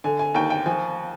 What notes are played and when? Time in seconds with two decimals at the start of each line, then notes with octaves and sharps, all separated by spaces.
0.04 D3 G#5
0.19 G#5
0.35 D#2 G5
0.50 G5
0.66 F3 G#5